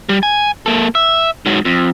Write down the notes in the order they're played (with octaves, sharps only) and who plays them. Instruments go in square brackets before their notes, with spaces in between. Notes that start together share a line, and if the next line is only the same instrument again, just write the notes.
[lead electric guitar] G3
G#5
A#3 A4
E5
G#2 F#3
F2